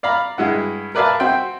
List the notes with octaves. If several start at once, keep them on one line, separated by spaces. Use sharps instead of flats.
D5 F5 A#5 B5
G2 G#3 E4 F#5
A#4 B4 D5 E5 F5 A5
C4 F#4 E5 G5 C6